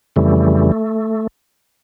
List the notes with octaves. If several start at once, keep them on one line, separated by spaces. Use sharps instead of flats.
F2 C#3 E3 G3 A3